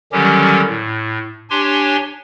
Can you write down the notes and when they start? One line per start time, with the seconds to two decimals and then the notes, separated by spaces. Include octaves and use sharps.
0.12 D3 D#3 F#3 G3 C#4 G4
0.68 A2
1.50 D4 G4 C#5 G#5 C6